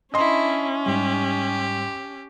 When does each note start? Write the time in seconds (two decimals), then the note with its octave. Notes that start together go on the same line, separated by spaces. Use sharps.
0.14 C#4 D4 E4 D#5 C6
0.86 G#2 G3 G4